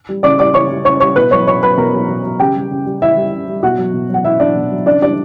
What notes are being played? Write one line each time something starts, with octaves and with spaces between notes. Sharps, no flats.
G3
C#3 D5 D6
G3 D5 D6
C#3 C#5 C#6
G3
C#3 C#5 C#6
G3 C#5 C#6
B2 B4 B5
F#3 C#5 C#6
B2 C#5 C#6
F#3 B4 B5
B2 A#4 A#5
F#3
B2
F#3
C#3 G4 G5
G3
C#3
G3
C#3 E4 E5
G3
C#3
G3
B2 F#4 F#5
F#3
B2
F#3 F#5
B2 E4 E5
F#3 D4 D5
B2
F#3
C#3 D4 D5
G3 D4 D5